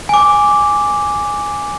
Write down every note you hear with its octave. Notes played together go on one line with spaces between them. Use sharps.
G#5 D6